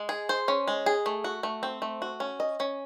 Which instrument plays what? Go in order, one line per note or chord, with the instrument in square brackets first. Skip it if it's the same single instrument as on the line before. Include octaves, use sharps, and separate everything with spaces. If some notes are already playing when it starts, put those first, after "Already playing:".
Already playing: [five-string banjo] G#3
G#4
C5
C#4
G#3
G#4
A3
F#4
A3
C4
A3
F#4
C#4
D#5
C#4